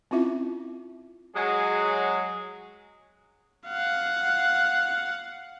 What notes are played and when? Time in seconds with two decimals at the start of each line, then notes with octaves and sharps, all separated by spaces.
0.11 C4 C#4 E4 F4 E5
1.36 F#3 G#3 G#4
3.67 F5 F#5